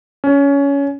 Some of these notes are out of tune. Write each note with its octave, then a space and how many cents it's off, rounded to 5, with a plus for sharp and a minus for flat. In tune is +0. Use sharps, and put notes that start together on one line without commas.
C#4 +20